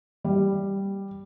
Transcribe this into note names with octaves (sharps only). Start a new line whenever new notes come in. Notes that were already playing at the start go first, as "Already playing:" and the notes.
G3